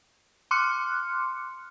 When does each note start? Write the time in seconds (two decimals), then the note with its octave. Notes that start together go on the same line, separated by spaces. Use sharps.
0.51 C6 D6 F6 F#6 C#7